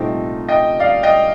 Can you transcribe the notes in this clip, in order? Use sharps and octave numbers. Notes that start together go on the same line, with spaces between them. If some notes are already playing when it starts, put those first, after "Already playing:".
Already playing: C2 A#2 A3 C4 D#4
D#5 G5
D5 F5
D#5 G5